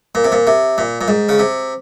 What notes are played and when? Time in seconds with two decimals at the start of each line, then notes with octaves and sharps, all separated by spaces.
0.15 A#2
0.24 C3
0.32 A#2
0.47 C3
0.78 A#2
1.01 A#2
1.08 G#2
1.29 C#3
1.39 C3